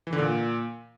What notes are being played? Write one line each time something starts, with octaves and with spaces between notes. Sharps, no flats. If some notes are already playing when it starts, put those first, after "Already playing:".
E3
D3
A#2